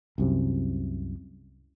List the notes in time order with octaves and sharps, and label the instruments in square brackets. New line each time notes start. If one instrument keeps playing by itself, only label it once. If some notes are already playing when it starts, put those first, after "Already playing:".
[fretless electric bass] C2 F#2 C3